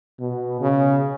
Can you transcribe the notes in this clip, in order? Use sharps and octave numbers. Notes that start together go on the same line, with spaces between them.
B2
C#3